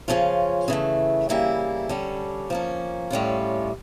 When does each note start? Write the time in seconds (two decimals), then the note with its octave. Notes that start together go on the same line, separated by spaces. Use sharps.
0.08 C#3 F3 C#4 F4
0.68 C#3 E3 A3
1.29 C#3 E3 G3 A#3 E4
1.89 D3 G3 C#4
2.50 F3 A#3 C#4
3.11 A2 G3 C#4 F4